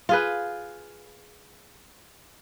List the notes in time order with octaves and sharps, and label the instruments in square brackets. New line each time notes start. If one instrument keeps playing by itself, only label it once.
[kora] F4 G#4 B4